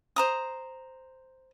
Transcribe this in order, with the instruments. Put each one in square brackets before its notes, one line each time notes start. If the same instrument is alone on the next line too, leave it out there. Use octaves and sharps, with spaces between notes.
[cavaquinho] C5 A#5 D#6